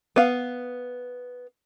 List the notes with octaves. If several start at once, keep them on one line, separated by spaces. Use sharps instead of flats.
B3 F5